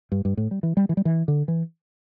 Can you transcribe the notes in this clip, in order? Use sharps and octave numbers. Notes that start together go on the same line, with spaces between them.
G2
G2
A2
G3
E3
G3
E3
G3
E3
D3
E3